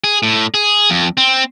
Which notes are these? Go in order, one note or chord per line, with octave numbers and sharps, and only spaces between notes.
G#4
A2
G#4
F2
C4